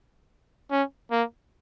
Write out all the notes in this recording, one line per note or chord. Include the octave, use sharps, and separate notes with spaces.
C#4
A#3